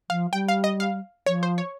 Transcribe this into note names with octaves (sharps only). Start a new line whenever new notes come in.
F3 F5
G3 G5
F5
D#5
F5
F3 C#5
C5
C#5